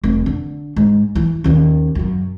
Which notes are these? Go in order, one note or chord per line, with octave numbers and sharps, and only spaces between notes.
F1
D3
G#2
E3
D#2 C#3
F#2 C#3